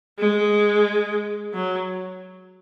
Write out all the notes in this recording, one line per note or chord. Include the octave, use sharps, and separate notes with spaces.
G#3
F#3